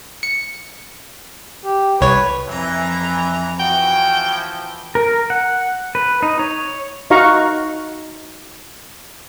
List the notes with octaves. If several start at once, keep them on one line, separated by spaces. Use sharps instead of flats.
C#7
G4
C2 B4 C#5
F2 E3 A#5
E3 F3 F#4 G5
A#4
F#5
B4
D#4
C#5
D#4 F#4 F5 A#5 C#6